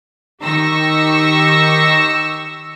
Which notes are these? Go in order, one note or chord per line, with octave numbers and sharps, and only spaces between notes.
D#3 G4 C#6 E6 A#6